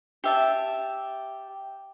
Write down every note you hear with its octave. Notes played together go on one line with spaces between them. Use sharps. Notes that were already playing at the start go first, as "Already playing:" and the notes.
G4 E5 A5